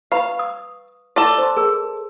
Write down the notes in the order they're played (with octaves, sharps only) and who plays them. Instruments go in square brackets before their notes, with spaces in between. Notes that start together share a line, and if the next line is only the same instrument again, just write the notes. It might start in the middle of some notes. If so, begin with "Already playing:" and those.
[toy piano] B4 B5 C#6 [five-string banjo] F5
[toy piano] D#6
[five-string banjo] A4 D5 [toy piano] A5
[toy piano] C5 C6
G#4 A#4